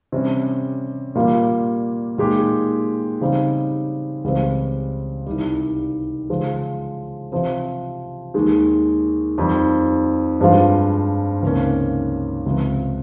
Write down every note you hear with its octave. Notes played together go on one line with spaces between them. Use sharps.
C3 G3 C#4
A#2 G3 A#3 F4
A#2 G#3 D#4 G4
C#3 G3 C4 D#4
C#2 C#3 G3 C4
C2 C3 D#3 G3
C#3 F3 G#3
C3 F3 C4
D#2 D#3 G#3
F2 D#3 G3
G2 F3 G#3 C4 F4
C#2 C3 D#3 A#3 C#4
C#2 C3 F3